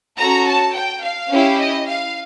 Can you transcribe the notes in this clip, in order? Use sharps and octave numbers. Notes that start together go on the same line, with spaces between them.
C#4 F#4 A4 A#5
A5
G5
F5
C#4 E4 G4
D#5
F5